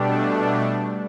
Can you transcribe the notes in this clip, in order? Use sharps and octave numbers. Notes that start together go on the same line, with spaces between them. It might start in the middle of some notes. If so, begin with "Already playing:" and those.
Already playing: B2 G3 A3 D4 G4